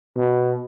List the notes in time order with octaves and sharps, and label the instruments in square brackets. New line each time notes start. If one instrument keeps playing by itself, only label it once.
[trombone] B2